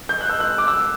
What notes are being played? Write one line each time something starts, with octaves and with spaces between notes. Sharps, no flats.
G6
F#6
E6
F#6
D6
E6